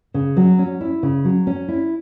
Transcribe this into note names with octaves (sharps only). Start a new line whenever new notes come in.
C#3
F#3
C#4
E4
C#3
F#3
C#4
E4